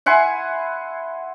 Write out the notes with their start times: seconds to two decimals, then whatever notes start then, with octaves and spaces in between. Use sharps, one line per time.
0.06 E4 F#5 G#5 C6